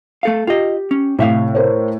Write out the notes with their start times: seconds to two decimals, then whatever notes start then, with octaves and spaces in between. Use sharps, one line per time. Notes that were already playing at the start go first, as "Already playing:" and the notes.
0.23 A3 A4 F5
0.47 F4 G4 D#5
0.91 C#4
1.19 A2 C3 E5 F5
1.55 A#4 C5 C#5